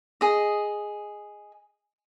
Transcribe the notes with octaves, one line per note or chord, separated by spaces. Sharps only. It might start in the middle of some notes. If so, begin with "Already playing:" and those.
G#4 D#5